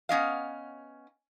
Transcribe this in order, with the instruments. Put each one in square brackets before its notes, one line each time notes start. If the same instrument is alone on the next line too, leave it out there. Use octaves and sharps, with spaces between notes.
[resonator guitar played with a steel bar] B3 C#4 D#5 F5